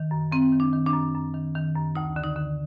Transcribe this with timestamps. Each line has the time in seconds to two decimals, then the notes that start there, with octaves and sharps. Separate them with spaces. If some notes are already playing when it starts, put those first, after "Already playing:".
Already playing: D#3
0.11 F#2
0.32 F#2 C4
0.52 D#3
0.60 D4
0.73 D#3
0.86 D4
0.94 F#2
1.14 F#2
1.34 D#3
1.55 D#3
1.75 F#2
1.96 D2 D#4
2.16 D3
2.23 D#4
2.36 D3